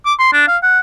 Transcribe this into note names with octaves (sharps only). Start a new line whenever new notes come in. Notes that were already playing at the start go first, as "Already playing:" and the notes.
D6
C6
D4
F5
F#5